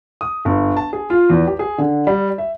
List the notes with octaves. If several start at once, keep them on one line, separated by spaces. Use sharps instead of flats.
D#6
G1
A5
G#4
F4
E2
G4
G#4
D3
G3
E5